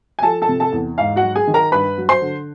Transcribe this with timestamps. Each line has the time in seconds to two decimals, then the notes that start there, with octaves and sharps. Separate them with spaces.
0.19 G#5
0.23 F3 A4 A5
0.42 A4 A5
0.48 C3
0.60 A4 A5
0.72 E2
0.98 G#2 F5
1.16 F#4 F#5
1.22 F#3
1.35 G#4 G#5
1.47 D#3
1.54 A#4 A#5
1.72 G2 B4 B5
1.98 F#3
2.09 C5 C6
2.21 D3